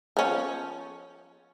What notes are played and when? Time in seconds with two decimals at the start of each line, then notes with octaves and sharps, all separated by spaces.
0.17 F3 C#4